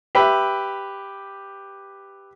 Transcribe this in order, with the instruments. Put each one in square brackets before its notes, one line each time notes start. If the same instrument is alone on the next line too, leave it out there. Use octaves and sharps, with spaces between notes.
[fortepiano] G4 B4 E5